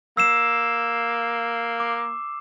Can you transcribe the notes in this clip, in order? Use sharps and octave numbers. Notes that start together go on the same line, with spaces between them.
A#3 E6 C7 E7
D6